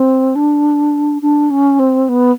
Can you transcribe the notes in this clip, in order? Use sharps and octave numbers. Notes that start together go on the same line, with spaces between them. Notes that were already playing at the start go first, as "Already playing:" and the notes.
Already playing: C4
D4
D4
C#4
C4
B3